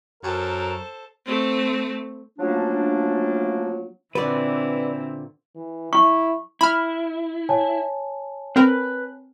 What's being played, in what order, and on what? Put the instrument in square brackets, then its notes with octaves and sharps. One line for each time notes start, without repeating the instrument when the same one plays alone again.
[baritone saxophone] F#2 [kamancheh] A4 C5 [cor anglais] A#4
[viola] A3 C4
[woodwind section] F3 F#3 A3 A#3 C#4 D4
[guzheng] A#2 D3 F#4 [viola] E3 C4 [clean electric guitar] B4 D5
[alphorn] E3
[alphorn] E4 [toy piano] C#6
[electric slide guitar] E4 [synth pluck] B5 F6
[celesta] C#5 G#5 A5
[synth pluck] C4 A#4 [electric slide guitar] B4